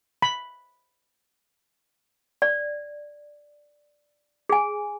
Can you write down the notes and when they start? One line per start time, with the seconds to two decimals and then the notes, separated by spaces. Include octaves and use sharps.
0.22 B5
2.42 D5
4.49 G#4 G#5